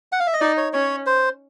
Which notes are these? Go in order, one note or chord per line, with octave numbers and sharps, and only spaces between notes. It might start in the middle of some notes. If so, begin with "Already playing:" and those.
F#5
F5
E5
D#5
D#4 D5
C#5
C#4 C#5
C5